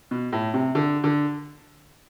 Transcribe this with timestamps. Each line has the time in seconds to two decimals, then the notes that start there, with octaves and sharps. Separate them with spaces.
0.11 B2
0.32 A2
0.54 C3
0.75 D3
1.04 D3